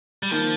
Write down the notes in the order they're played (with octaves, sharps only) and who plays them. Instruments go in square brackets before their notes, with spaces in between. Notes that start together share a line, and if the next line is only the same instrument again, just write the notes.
[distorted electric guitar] G3
[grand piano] D#3 A#3 [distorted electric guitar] F3